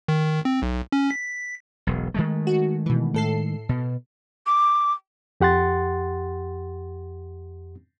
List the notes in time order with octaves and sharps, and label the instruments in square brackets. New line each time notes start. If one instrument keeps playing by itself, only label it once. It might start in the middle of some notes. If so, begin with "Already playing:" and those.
[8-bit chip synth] D#3
C4
B1
C#4
B6
[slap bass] E1 B1
D#3 G#3 A3
[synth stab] F#4
B2 E3
A2 A4 C7
[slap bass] B2
[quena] D6
[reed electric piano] F2 G4 F#5 C6 A6